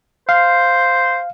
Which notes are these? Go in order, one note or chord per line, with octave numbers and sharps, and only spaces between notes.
C5 F5